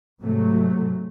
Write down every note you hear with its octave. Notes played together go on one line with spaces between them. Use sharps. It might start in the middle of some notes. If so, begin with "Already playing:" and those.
G#2 C3 F#3 A3